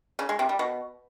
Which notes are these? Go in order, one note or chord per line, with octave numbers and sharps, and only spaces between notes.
C#3
G#3
C3
G3
B2